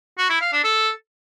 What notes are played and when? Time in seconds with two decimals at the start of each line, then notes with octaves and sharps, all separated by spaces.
0.18 F#4
0.29 E4
0.41 F5
0.52 D4
0.64 A4